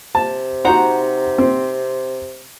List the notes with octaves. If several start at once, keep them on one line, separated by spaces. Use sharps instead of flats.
C3 A5
D#4 F#4 C5 F#5 A#5
C4